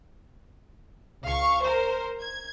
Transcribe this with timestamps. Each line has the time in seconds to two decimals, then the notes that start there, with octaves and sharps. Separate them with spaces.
1.24 C#2 F5 C#6
1.63 A#4 C5
2.21 G#6